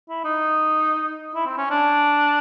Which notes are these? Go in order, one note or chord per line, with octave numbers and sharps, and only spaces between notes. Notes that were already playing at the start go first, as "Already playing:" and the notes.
E4
D#4
E4
C4
C#4
D4